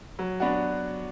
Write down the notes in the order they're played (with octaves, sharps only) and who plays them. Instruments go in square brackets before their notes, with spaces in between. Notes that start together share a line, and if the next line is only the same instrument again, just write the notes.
[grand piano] F#3
B3 D4 F#4